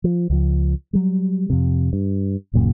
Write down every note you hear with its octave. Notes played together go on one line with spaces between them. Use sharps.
F3
C#2 F3
F#3 G3
F2 C3
G2
D1 F#2 A#2 C#3